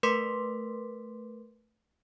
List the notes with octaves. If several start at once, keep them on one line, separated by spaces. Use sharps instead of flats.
A3 A#4 B4 C6 D6 B6